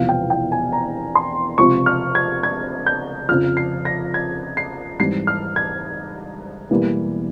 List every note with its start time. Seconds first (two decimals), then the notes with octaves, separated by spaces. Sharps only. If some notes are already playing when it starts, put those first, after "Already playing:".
Already playing: E1 E2 C3 F3 F5
0.09 G5
0.30 G5
0.52 G#5
0.73 A#5
1.15 C6
1.58 C#2 C3 F3 C4 C#6
1.86 F6
2.15 G#6
2.43 G#6
2.86 G6
3.29 F2 C#3 F3 F6
3.57 C7
3.85 A#6
4.14 G#6
4.57 C7
4.99 G#2 E3 G3 C4 C7
5.27 F6
5.56 G#6
6.70 E1 E2 E3 G3 A#3